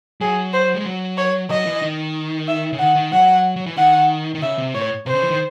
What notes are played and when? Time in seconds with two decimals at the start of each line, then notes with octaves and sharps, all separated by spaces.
0.21 F#3 G#4
0.54 C5
0.74 G#3
0.85 F#3
1.18 C#5
1.50 F#3 D#5
1.66 E3
1.82 D#3
2.48 E5
2.72 C#3
2.79 D#3 F#5
2.95 D#3
3.12 F#3 F#5
3.56 F#3
3.66 E3
3.77 D#3 F#5
4.35 D#3
4.42 C#3 E5
4.58 C3
4.74 A2 C#5
5.06 C3 C5
5.15 C#3
5.23 E3
5.31 D#3